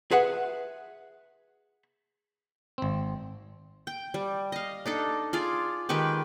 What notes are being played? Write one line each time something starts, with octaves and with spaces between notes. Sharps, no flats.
G#4 B4 E5 F#5
G#1 C4
G5
G3
D#5 F5
D4 D#4 A4
F4 G#4 D5
D#3 G#3 G4 B4